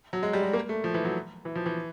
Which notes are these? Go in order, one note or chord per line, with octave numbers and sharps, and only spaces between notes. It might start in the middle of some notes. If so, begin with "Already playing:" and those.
F#3
G#3
G3
G#3
A#3
A3
F3
E3
F#3
E3
F3
E3